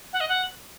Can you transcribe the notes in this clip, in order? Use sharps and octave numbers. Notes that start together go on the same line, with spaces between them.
F#5
D#5
F#5